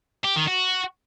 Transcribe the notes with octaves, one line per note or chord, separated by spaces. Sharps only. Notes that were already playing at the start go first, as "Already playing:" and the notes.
G4
D#3
F#4